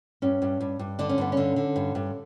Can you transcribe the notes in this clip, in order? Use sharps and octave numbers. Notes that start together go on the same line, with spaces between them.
G2 C#4
G2
G2
G2
D3 D4
C#4
G2 B3
D3 C#4
D3
G2
G2